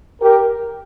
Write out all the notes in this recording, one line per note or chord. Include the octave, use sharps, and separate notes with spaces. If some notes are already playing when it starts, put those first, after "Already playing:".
G4 A#4